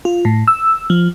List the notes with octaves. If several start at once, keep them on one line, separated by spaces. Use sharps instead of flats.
F4
A2
E6
F3